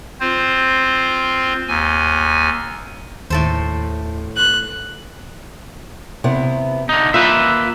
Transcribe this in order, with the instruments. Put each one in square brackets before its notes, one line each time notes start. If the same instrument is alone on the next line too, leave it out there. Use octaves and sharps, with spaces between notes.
[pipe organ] C4 F4 C5
D#2 G#5
[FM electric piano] D#2 [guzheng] A2 A4 C5
[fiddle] F#6
[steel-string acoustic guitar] C3 B3 E4
[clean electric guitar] D3 D#4
[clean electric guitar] A#3 B4 E5 [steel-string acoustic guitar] F4